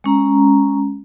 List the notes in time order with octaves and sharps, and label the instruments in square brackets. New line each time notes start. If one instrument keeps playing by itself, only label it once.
[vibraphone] G#3 C#4 A#5